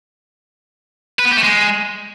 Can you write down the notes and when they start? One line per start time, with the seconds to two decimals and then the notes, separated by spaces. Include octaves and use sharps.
1.19 B4
1.25 B3
1.31 G4
1.37 A3
1.43 G#3